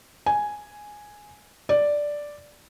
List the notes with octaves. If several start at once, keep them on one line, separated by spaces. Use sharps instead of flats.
G#5
D5